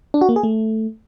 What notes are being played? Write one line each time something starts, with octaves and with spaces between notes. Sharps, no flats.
D4
F#4
A#3
G#4
A3